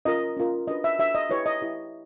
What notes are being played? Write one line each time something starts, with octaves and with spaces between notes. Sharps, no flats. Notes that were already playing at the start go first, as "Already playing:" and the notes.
C#4 F4 A#4 D#5
C#4 F4 A#4
D4 F#4 B4 D#5
E5
D4 F#4 B4 E5
D#5
E4 G4 B4 C#5
D#5
E4 G4 B4